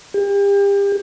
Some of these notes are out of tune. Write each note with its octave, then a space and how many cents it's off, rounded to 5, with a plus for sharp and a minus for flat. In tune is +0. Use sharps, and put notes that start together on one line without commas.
G4 +35